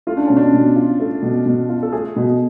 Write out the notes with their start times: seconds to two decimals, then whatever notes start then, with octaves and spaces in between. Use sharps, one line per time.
0.07 A3 F4
0.17 D4
0.27 B2 C#4
0.37 D4
0.53 B2
0.76 F4
1.00 A3
1.23 B2
1.46 B2
1.69 F4
1.83 A4
1.92 A3 G#4
2.16 B2
2.28 G#4